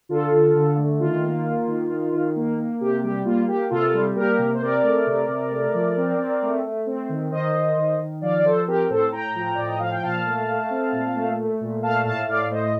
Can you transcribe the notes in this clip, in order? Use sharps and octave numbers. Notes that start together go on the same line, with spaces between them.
D3 F4 A4
D3
D3
A3
D#3 F4
A#3
A#3
D#3
D#3
D#3
A#3
A#3
C3 G4
G3 G4
A#3 F4
A#3 G4
C3 F4 A4
G3
A#3 G4 A#4
C3
C5
C4 A#4 D5
A3
C3
C3
A3
F3
C4
C4
A3
A3
C4
D#3
D#3 C5 D#5
D#3
D#3
D#3
F3 D5 F5
D5
F3 A4 C5
C4 G4 A#4
A2 A4 C5
A2 G5 A#5
F3
A2 D5
D#5
F3 F5
G5
A#2 F5 A5
A3
A3
C4
A#2
A3
A3
A#2
A3 F5 A5
A2 F5 A5
A2 D5 F5
A3 C5 D#5
D#5